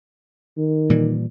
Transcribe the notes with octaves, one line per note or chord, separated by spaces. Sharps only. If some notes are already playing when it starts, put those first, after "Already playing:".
D#3
A#2 E3 G3